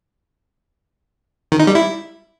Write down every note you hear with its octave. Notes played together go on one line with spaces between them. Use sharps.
D#3
D#4
G3
E4